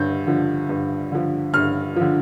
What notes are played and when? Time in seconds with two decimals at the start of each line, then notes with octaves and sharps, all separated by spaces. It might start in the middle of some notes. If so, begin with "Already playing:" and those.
Already playing: G2 D3 G6
0.26 D3 F3
0.69 G2
1.12 D3 F3
1.54 G2 F6
1.96 D3 F3